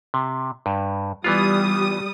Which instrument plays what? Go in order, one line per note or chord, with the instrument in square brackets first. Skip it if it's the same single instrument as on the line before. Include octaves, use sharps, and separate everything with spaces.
[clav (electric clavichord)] C3
G2
[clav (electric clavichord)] E3 B3 F4 [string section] G3 D#6